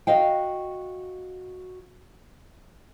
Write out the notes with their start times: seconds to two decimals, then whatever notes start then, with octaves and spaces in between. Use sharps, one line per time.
0.07 F#4 D#5 F5 G5